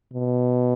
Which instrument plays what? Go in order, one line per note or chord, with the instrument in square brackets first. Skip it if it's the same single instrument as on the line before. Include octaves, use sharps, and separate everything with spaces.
[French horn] B2